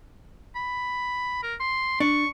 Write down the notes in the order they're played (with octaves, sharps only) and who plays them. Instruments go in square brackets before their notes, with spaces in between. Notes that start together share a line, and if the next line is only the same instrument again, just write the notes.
[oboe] B5
A#4
C6
[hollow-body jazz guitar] D4 [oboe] C#6